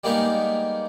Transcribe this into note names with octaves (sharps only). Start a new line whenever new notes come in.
G3 G#3 A#3 B3 D#4 F5